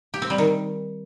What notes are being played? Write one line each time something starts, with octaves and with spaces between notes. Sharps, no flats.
G4
C4
G3
D#3